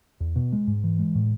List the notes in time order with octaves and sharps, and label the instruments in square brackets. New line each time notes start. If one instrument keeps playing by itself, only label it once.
[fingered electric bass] E2
B2
G#3
G#2
E3
G#3
A2